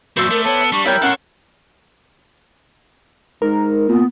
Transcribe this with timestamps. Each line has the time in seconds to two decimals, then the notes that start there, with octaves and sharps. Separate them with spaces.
0.17 F#2 A#2 F#4 C5 D5 E5
0.31 A3 A#4
0.45 B3 A4 C#5 A5 E6
0.72 G3 D4 C#6
0.86 E4 A#4 C#5 G5 E6
1.02 C#4 A4 C#5 F#5 C6
3.42 G#2 A#4
3.89 A#2 B3